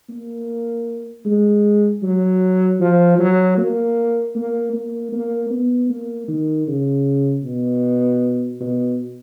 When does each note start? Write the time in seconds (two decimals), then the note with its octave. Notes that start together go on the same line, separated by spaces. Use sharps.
0.09 A#3
1.25 G#3
2.03 F#3
2.80 F3
3.18 F#3
3.58 A#3
4.35 A#3
4.73 A#3
5.12 A#3
5.51 B3
5.89 A#3
6.28 D#3
6.67 C#3
7.44 B2
8.61 B2